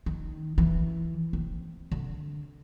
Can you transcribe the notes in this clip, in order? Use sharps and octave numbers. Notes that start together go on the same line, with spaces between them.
D#3
E3
C4
D3